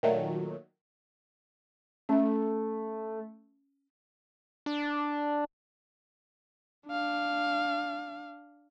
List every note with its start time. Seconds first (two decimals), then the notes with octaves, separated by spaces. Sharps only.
0.03 A#2 D#3 F#3 A3
2.09 A3 C#4
4.66 D4
6.88 D4 F5